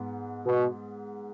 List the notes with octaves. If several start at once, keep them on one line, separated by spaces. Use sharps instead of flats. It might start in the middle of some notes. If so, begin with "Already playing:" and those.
Already playing: G#2 B3
B2